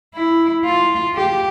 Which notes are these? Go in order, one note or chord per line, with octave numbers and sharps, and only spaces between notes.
E4
F4
G4